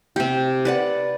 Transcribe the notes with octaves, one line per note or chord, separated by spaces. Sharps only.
C3 G4
B4 D5 F#5